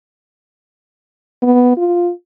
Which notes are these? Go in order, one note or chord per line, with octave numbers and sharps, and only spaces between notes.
B3
F4